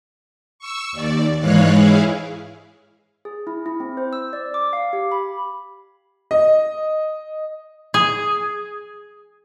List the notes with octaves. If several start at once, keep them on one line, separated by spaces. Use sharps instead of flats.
C#6 E6
D#2 D5
G#2 E3 G#3 C#5 F5 F#6
E4 G#4 F5
G#4
E4
E4
C4
C5
E6
D5
D6
F5
G4
B5
D#5
G#4